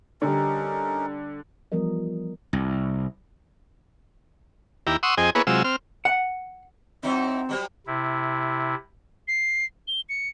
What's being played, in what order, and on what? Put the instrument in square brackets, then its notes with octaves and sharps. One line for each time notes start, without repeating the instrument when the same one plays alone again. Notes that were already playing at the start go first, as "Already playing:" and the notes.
[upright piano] D3 G3 [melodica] C#4 D#4 A#4
[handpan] E3 F3 G3 B3 A#4 D#5
[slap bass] C2
[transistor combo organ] D#2 E4 G4 A#5
F#5 C6 C#6 D#6 E6
F2 C4 G#4 D#5 G#5
A#3 B3 E4 G#4 B4 C#5
C3 F#3 G#3 F4 E6
C4 F6
[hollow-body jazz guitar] F#5
[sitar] F#3 D#4 E4 [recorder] C4
[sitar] F#3 G3 C5
[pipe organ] C3 E4
[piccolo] C7
G7
C#7